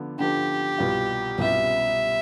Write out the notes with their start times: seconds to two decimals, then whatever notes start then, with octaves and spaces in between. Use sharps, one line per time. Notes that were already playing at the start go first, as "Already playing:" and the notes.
Already playing: D3 F3 B3 D4
0.19 D3 F3 B3 D4 G4
0.78 C2 B2 G3 B3 F4
1.38 C2 B2 G3 B3 F4 E5